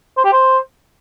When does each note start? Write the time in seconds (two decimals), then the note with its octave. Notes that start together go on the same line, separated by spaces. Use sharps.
0.17 C5
0.25 G4
0.33 C5